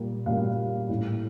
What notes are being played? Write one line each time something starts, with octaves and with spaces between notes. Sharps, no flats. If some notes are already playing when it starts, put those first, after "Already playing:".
Already playing: A#2 G3 A#3
A#2 G3 A#3 F5
A2 A3